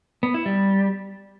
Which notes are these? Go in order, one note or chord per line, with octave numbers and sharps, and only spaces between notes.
B3
E4
G3